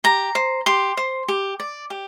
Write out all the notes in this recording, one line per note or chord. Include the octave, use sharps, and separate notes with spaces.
G4 A#5
C5
G4 C6
C5
G4
D5
G4